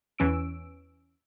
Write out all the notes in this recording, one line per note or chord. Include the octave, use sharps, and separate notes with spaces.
E2 E3 C#4 E6 D7